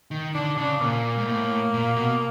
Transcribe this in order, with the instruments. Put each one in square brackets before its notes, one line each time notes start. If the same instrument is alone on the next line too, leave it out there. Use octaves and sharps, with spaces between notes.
[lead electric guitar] D#3
[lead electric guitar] D3 [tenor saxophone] D4
[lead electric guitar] C#3 [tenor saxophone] D4
[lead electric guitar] A#2 [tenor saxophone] A#3
[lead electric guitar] G#2
A2
A#2
B2